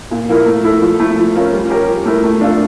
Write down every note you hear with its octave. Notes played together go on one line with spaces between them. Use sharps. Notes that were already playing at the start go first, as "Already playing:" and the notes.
A#2
F3 A#3 E4 A#4
A3
E4 A4
F3
A3 E4
F3
C#4 F4 A#4
G3
C#4 G4 A#4
F3
A3 E4 A#4
A3
D4 F4 A4